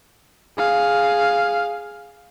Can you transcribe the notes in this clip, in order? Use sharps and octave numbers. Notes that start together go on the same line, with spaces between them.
G#4 F5